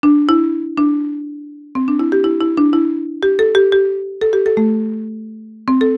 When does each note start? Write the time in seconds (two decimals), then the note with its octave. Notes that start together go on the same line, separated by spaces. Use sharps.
0.03 D4
0.29 E4
0.77 D4
1.75 C4
1.88 D4
1.99 E4
2.12 G4
2.24 E4
2.41 E4
2.57 D4
2.73 E4
3.23 G4
3.39 A4
3.55 G4
3.72 G4
4.21 A4
4.33 G4
4.46 A4
4.57 A3
5.68 C4
5.81 A4